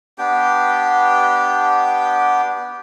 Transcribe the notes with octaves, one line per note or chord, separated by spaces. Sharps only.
B3 D4 G4 G5